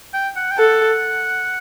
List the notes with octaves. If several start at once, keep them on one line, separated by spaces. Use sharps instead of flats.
G5
F#5
G5
A4 F#5